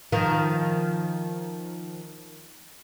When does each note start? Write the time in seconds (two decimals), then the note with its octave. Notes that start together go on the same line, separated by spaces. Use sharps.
0.12 D#3 F3